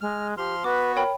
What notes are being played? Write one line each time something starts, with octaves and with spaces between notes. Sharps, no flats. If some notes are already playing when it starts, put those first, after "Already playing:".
G#3 F6
F3 G4 C6 F6
B3 F#4 B4 D6
A#4 C#5 G5 B5